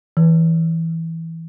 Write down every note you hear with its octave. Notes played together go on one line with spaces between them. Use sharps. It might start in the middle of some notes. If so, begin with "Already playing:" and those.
E3